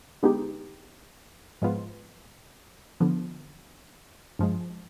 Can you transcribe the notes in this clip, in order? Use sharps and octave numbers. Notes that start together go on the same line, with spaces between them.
D3 G#3 B3 D#4 G4
G#2 F3 G#3 B3 F4
D3 F3 B3
G2 F3 G#3